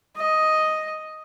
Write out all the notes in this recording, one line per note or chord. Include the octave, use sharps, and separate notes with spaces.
D#5